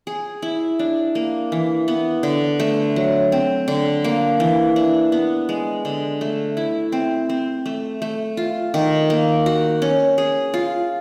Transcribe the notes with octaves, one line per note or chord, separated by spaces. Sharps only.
G#4
E4
D4
A#3
E3
B3
D3
A3
F#3
C4
D3
A#3
E3
D4
B3
G#3
D3
A3
E4
C4
C4
A3
A3
F4
D#3
A#3
F#4
C#4
G#4
F4